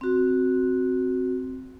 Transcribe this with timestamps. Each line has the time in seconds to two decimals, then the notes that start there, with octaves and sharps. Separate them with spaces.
0.01 C4 F#4